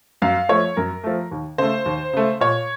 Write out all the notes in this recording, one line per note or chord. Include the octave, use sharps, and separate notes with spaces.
F#2 F5
F3 A3 C#5
F#2 A#4
F3 A3
D#2
C#3 A3 C5
D#2
C#3 A3
A#2 C#5